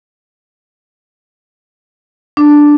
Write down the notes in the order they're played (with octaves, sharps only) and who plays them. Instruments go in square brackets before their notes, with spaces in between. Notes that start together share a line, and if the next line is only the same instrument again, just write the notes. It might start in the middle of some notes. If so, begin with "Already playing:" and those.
[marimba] D4